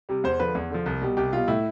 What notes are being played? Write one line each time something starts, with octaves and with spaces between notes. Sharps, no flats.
C3 G3
E2 C5
D3 F3 B4
E2
D3 F3
C2
B2 G3
C2 G4
B2 G3 F4
A2 E4